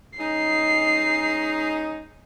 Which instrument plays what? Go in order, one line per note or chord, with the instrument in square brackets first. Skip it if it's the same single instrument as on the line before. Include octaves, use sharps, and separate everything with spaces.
[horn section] G#3 C#4 D#4 [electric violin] C7